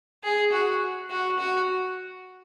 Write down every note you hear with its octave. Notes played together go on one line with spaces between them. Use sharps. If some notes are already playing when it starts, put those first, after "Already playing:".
G#4
F#4
F#4
F#4